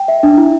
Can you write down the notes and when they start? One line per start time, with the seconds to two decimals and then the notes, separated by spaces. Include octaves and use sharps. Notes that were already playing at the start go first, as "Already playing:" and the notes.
Already playing: G5
0.08 E5
0.23 D4
0.38 E4